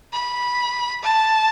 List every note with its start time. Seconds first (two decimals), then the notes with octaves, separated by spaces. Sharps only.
0.13 B5
1.03 A5